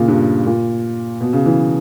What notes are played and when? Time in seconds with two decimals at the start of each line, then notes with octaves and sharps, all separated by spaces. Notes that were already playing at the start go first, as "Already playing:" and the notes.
Already playing: A#2 C#3
0.08 G2
0.46 A#2
1.21 B2
1.33 C#3
1.46 E3